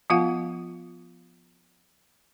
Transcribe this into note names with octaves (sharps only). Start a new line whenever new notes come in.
F3 B3 F4 F5 F#5